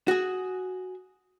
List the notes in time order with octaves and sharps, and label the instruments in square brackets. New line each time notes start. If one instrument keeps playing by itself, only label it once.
[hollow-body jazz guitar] F#4 G#4